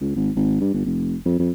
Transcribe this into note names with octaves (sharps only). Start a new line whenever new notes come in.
C#2
G#1
G#1
G2
G1
F1
F2
F2